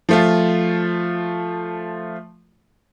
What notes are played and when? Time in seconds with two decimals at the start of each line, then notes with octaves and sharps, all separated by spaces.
0.09 F3 A3 F4